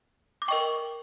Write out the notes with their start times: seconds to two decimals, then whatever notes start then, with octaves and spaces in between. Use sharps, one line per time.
0.42 D6
0.48 A#4 D#5 G5 C#6